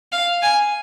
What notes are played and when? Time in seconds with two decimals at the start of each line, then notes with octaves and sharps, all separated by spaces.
0.12 F5
0.42 G#5